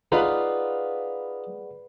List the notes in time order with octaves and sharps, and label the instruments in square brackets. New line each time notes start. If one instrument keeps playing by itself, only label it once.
[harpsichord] D#4 F4 F5 [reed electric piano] G#4 D5 F#5 [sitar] B4